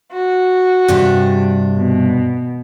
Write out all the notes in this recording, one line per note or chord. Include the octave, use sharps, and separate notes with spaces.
F#4
G2 C3 D4
B2